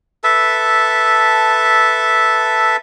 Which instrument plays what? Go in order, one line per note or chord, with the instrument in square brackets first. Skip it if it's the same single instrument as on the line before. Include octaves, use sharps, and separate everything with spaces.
[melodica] A4 B4 E5 A5